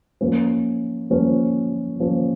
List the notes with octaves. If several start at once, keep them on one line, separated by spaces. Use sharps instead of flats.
F3 A#3 C#4
F3 A#3 C#4
F3 A#3 C#4